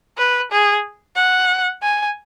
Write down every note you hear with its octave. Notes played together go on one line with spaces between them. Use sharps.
B4
G#4
F#5
G#5